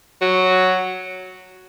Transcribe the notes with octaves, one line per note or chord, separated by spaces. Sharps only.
F#3